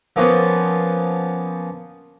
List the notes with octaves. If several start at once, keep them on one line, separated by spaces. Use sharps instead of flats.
F3 A#3 B3 C#4 F4 B4